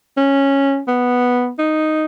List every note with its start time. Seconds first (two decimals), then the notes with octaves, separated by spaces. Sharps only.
0.17 C#4
0.88 B3
1.59 D#4